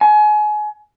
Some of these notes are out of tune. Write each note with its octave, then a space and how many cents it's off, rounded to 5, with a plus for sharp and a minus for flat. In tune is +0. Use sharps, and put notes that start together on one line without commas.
G#5 +30